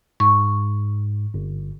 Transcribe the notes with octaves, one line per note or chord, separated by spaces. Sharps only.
G#2 C#6
G1